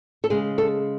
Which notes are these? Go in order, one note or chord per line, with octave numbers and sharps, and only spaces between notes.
A4
C#3 G#3 G#4
A4